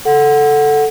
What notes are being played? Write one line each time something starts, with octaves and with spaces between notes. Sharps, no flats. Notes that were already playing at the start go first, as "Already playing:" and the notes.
A4 F#5